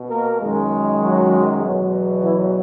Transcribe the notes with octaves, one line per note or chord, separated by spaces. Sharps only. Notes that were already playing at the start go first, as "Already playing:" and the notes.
Already playing: B2
A#3 A#4
F#2 D#3 G#3
F#3 F#4
E2 B2 F#3
E3 E4